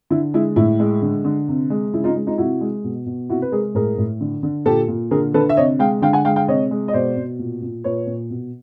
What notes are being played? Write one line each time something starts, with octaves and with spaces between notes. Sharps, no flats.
D3 E4
G#3 E4
A2 E4
G#3
D3
D3
C3
G#3
C#3 E4
D#4 F4
G#3
D#4 F4
C3 E4 F#4
G#3
B2
B2
C3 E4 F#4
B4
G#3 G#4 A#4
A2 G#4 A#4
A2
D3
D3
A#2 G4 A4
A#2
D3 G#4 A#4
D3 A4 B4
E5
C3 C#5 D#5
G#3 F5 G5
D3 F5 G5
F#5 G#5
G#3 F5 G5
F5 G5
C3 C#5 D#5
G#3
D#5
B2 C5 D5
B2
A#2
A#2
A#2 B4 C#5
A#2
B2